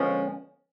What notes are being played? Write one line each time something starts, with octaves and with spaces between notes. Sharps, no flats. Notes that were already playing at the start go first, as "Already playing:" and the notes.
Already playing: D3 F3 G#3 B3 C#4